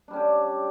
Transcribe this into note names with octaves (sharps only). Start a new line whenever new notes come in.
G3 C#4 D4 G4